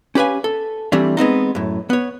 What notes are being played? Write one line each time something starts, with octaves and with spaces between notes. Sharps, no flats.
C#4 G4 B4 F5 G#5
A4
E3 G3 A3 C4 D4
G#3 B3 C4 D#4
F#2 A2
B3 C#5